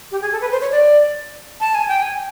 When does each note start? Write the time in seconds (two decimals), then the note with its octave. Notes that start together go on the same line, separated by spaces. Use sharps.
0.11 G4
0.22 G#4
0.32 A4
0.41 B4
0.52 C5
0.61 C#5
0.71 D5
1.60 A5
1.75 G#5
1.88 G5
2.02 G#5